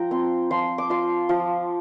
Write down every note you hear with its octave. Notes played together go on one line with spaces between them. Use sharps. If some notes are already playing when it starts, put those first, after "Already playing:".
Already playing: F3 F4 G5 A#5
C4 C6
F3 C6
D6
F4 C6
F3